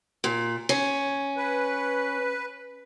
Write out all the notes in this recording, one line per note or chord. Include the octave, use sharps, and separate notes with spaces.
A#2
C#4
B4